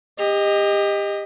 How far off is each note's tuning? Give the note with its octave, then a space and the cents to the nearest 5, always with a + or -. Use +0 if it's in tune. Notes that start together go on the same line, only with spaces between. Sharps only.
G4 +30 D#5 +0